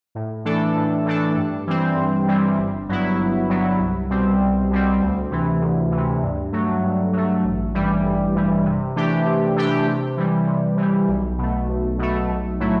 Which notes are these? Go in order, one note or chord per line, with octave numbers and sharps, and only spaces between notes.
A2
E3 A3 D4 A4
A2
E3 A3 D4 A4
G2
E3 G3 C4
G2
E3 G3 C4
G1
G2 F#3 B3 E4
G1
G2 F#3 B3 E4
C2
B2 G3 C4
C2
B2 G3 C4
D2
C3 E3
D2
E3
C3
G2
F#3 A3
G2
F#3 A3
A1
G2 E3 G3
A1
G2 E3 G3
C3
E3 A3 D4 G4
C3
E3 A3 D4 G4
C3
E3 G3
C3
E3 G3
B1
B2 A3
B1
B2 A3
B1
A2 F#3 A3 E4